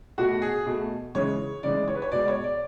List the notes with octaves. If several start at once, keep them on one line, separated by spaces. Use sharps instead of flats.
B2 A3 F#4
G#4
B2 A3
C#3 E3 G#3 C#5
C#3 E3 G#3 D5
C#5
B4
C#5
B2 G#3 D5
C#5
D5